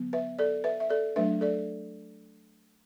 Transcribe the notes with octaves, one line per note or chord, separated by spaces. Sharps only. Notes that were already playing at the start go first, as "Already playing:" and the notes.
Already playing: D3 F#3 B3
B4 E5
A4 D5
B4 E5
E5
A4 D5
F#3 A3 D4 B4 E5
A4 D5